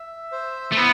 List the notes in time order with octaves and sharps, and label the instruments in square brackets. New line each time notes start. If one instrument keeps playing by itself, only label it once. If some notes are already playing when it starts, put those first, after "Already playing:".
Already playing: [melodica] E5
C5
[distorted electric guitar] A3
[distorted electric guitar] B3 [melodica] E4